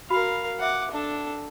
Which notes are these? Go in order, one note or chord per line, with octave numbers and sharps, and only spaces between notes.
F#4 A#4 F5 B5
C5 E5 F#5 D6
D4 A4